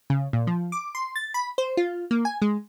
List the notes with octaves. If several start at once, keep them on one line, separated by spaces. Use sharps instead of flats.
C#3
A#2
F3
D6
C6
A6
B5
C5
F4
A#3
G#5
G#3